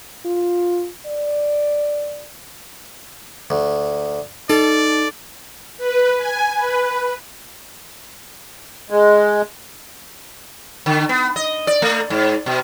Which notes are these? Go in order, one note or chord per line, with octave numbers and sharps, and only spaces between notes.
F4
D5
D2
D#4 A4 D5
B4
G#5
B4
G#3
D3
B3
D#5
D5
A3
G#2
B2